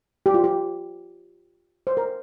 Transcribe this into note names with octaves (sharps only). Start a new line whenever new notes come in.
G4
F4
G4
C5
A#4